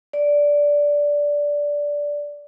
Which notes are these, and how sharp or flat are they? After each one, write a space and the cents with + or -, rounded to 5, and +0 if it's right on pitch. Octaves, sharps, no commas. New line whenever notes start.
D5 -10